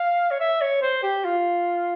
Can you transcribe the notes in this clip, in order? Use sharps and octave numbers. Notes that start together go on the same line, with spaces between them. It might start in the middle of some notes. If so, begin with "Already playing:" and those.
Already playing: F5
C#5
E5
C#5
C5
G4
F4